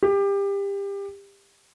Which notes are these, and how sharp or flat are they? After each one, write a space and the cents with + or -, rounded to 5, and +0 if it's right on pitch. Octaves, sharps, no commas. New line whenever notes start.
G4 +25